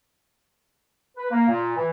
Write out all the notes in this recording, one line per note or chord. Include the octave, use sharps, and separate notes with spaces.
B4
A#3
A#2
E3